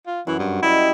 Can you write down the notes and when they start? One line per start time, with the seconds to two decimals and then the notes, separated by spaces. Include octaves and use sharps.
0.07 F4
0.27 F#2 E3
0.39 G2
0.63 G3 E4 D#5